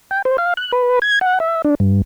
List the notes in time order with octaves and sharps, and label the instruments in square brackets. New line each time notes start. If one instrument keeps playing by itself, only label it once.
[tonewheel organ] G5
C5
F5
F#6
B4
G#6
F#5
E5
D4
G2